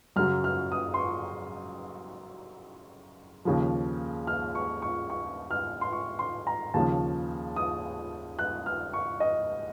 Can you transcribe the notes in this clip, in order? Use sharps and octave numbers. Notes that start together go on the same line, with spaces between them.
F#2 C#3 F#3 F6
F6
D#6
C6
C#6
D#2 C#3 F3
F6
C#6
C#6
C#6
F6
C6
C#6
C6
A#5
D#2 C#3 F3 A5
D#6
F#6
F6
C#6
D#5